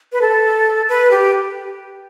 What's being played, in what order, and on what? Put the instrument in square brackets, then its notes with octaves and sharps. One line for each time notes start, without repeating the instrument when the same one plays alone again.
[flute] B4
A4
B4
G4